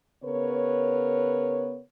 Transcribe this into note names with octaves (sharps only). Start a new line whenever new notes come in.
C#3 B3 A#4 B4 C#5